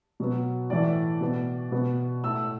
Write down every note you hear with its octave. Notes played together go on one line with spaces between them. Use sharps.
B2 F#3 B3
A2 E3 A3 D5
B2 B3
B2 B3
A2 A3 E6